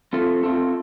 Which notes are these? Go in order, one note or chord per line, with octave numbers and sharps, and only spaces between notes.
A3 C4 F4 A4
A3 C4 F4 A4